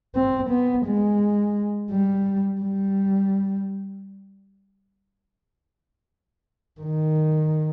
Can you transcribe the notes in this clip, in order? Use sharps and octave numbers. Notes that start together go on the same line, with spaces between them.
C4
B3
G#3
G3
G3
D#3